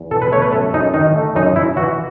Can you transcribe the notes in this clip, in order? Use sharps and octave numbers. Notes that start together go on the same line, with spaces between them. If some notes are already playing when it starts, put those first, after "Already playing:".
Already playing: E2
B2 A4
B4
A3 C#5
B4
F#2 A4
F#2 D#4
D#3 D#4
A3
F#2 D#4
F#2 E4
E3 F#4